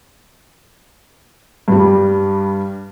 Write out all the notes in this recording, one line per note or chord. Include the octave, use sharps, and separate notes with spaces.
G2 G3